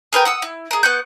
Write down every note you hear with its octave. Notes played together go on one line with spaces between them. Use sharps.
G#4 A#4 B4 G5
F#5 D#6 E6
E4
G#4 A#4
B3 F#5 C#6 G6